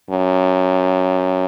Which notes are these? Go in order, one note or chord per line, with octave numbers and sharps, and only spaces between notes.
F#2